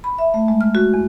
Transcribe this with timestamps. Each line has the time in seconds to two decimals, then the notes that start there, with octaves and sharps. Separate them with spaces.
0.04 B5
0.18 E5
0.34 A3
0.48 G#3
0.61 F6
0.75 F#4
0.94 E2